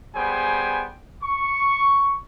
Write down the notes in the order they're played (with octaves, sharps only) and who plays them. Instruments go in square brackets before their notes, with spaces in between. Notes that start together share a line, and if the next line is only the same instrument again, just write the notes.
[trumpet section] G3 B3 G#4 C5 G5 G#5
C#6